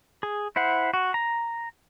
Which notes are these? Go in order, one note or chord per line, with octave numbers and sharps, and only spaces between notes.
G#4
E4 C5 F#5
F#4
A#5